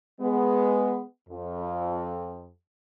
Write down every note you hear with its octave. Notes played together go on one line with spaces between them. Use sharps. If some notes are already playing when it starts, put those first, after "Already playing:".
G#3 B3
F2